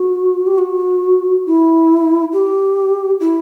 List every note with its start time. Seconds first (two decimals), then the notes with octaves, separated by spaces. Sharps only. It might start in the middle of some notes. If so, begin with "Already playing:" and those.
Already playing: F#4
0.47 G4
0.58 F#4
1.46 E4
2.33 G4
3.20 E4